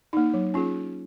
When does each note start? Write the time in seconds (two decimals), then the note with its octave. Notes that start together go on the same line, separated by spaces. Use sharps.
0.13 A#3 D#4
0.34 F#3
0.54 C#4 F4 G#4